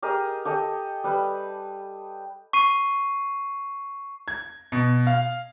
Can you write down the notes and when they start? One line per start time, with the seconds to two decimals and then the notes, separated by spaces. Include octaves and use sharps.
0.02 G4 G#4 A#4 D#5
0.45 G4 A4 D#5 G#5
1.04 G3 B4
2.53 C#6 C7 D#7
4.28 G#6
4.72 B2
5.07 F5